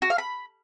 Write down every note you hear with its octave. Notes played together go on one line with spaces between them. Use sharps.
F#4
F5
B5